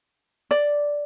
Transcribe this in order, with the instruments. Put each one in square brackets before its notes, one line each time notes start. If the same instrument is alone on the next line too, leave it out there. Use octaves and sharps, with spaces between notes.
[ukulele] D5